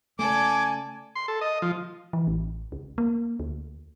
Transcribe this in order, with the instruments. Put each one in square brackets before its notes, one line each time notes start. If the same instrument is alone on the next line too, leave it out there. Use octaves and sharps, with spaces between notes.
[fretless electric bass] C#3 A3 [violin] A4 D5 [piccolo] G#5 [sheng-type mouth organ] D6
[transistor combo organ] C6
A4
D#5
F3
[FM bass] E3
A1
C#2
A#3
D2